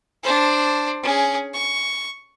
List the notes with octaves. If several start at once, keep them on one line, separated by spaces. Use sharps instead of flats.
D4 C5
C#4 G#4
C#6